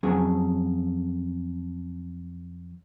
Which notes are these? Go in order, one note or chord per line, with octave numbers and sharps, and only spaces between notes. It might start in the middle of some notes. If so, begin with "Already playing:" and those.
F2 F#3 C#4 G#4 G#5